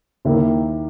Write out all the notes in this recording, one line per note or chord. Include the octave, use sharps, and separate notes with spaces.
D#2 D#3 A#3 E4 A#4